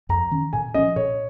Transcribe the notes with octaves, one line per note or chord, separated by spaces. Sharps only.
F2 A#5
D#3 C#4
A#2 G#5
F3 C#4 D#5
A#2 C#5